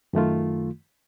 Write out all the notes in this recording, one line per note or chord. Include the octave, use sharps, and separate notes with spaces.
F#2 D#3 A3 F4